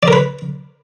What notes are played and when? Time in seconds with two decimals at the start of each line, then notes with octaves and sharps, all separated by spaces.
0.03 D5
0.08 A#4
0.13 B4